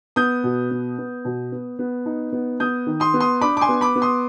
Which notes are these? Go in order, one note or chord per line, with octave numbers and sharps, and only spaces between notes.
B3 D#6 G6
B2
B3
B3
B2
B3
B3
D#4
B3
B3 D#6 G6
D#3
C6 D#6
B3
C6 D#6
D4 B5 D6
D6
G#5 C6
B3
B5 D6
B3
C6 D#6